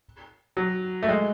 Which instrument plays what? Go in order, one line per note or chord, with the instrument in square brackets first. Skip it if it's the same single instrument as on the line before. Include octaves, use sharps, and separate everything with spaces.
[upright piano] F#3
A3
G#3